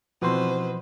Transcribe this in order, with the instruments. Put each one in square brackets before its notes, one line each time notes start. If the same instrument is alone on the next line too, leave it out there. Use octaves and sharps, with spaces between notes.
[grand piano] B2 E3 C4 [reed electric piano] F3 C6 [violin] B4 C5